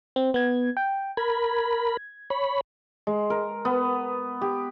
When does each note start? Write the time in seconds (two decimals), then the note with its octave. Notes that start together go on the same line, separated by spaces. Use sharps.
0.16 C4
0.34 B3 G#6
0.77 G5
1.17 A#4 B5 G#6
2.30 C#5 B5
3.07 G#3
3.30 A#4
3.65 B3
4.41 G4